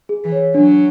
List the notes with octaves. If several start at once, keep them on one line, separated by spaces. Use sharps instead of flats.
G#4
E3
C#5
F#3 D4